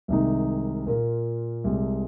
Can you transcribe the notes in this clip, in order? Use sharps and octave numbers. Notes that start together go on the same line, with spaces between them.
C2 C3 D#3 G#3 D#4
A#2 A#3 F4 A#4
C2 C3 G#3